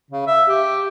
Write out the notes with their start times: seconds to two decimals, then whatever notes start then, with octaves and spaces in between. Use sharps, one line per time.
0.11 C#3
0.27 E5
0.48 G4